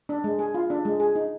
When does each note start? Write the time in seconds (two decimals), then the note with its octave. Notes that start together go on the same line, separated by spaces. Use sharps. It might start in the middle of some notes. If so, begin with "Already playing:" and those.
0.09 D4
0.24 G#3
0.39 G#4
0.54 F4
0.70 D4
0.85 G#3
1.00 G#4
1.15 D#4